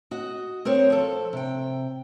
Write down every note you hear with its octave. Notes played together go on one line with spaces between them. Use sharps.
F#4 D#5
C4 A#4 C5 C#5
F3 A4
C3 G5